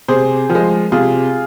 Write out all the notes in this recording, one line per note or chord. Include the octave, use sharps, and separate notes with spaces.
C3 G#4 C5
F3
G#3
C3 F4 G#4